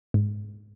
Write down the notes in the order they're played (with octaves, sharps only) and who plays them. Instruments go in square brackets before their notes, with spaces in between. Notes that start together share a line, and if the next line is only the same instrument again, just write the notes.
[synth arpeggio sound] G#2